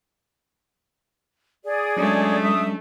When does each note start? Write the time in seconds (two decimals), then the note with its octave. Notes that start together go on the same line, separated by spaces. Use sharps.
1.65 G#4 D5
1.97 F#3 G#3 A3 C#4 D4
2.42 E5 D#6